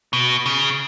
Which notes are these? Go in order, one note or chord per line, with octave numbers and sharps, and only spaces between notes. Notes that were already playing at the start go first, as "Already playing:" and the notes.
B2
C#3